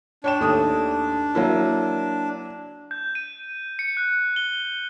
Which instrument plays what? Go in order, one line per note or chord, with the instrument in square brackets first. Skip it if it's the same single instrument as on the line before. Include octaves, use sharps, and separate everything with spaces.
[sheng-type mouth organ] D4 [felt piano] C#5 G5 E7
[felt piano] D#2 A3 D#6
F#3 A#3 E4
[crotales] G6
D#7
C#7
F#6
G7